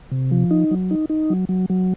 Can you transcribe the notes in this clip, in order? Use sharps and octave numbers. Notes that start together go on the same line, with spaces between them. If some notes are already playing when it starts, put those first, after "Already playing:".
C3
F3
D#4
F#3
D#4
D#4
F#3
F#3
F#3